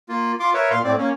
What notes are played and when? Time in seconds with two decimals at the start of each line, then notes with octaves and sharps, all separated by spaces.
0.09 A#3 F4
0.40 F4 C6 D6
0.54 A#4 B4 C#5 E5
0.71 A#2 F5 C6
0.84 A2 C4 D5
0.98 A#3 C#4